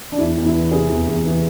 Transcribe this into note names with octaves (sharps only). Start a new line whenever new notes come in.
D4
E2 E4
E2
E4
E3
C3 E4 G#4
E2
E2
E3